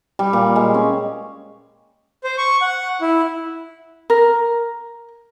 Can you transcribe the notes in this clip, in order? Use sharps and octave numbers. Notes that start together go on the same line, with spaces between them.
G3
A#2
G#3
C#4
C5
C#6
F#5
E4
A#4